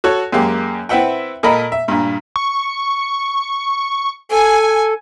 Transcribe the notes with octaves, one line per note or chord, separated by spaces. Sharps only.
F#4 A4 C#5
F#2 G#3 A#3 G4
C4 E4 B4 E5 F#5 G5
A#2 A4 A#4 D#5 B5
E5
G2 A#2
C#6
A4 G#5